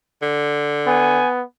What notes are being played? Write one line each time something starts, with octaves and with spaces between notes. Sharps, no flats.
D3
B3 G#5